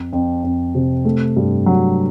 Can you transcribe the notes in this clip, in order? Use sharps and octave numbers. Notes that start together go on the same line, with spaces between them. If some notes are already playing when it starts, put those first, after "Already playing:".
Already playing: F2
F2
F2
C3
A3
G2
F#3